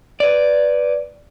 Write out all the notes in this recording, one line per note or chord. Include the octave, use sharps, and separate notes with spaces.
B4 D5